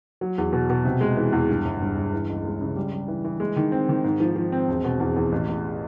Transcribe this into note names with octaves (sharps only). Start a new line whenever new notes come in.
F#3
E2
B2
B2
C3
G#3
E3
E2
G2
G1
G1
G1
E3
C#2
G#3
C#3
G3
G3
E3
E3
G#3
D#3
C4
D#3
G#2
F3
F3
C4
E1
B2
E2
E2
A1
A1